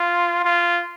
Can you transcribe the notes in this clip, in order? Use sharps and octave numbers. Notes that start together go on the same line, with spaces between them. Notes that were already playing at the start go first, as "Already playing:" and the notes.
Already playing: F4
F4